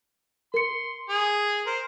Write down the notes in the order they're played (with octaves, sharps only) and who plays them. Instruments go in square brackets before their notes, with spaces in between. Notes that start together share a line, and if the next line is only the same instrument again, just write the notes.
[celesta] A#4 C#7 [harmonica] C6
[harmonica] G#4
A#4 C5